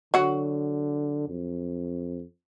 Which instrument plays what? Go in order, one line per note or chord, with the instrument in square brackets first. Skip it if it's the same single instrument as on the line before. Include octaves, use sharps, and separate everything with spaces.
[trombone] D3 [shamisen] F#3 F#4
[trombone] F2